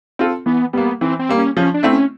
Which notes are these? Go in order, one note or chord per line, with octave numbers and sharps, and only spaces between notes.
C4 F4 A4
E3 B3
G3 A#3 B3
E3 C4
C4
G3 A#3
C#4
F3 C#4
D4
A3 C4 E4
C#4